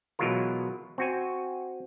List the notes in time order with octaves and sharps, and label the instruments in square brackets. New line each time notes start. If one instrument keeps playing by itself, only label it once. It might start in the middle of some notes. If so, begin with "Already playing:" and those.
[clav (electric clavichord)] B2 E3 F#3 G#3 F4 A#4
C4 F#4 G#5